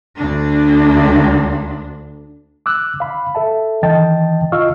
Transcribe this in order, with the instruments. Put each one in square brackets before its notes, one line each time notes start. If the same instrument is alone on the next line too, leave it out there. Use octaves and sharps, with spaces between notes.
[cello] D2 D4
[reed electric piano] D6 E6 F#6
F5 B5
A4 E5 A5
D#3 E3 D#5 G5 A5 A6
F4 D#5 F5 C#6 E6 F6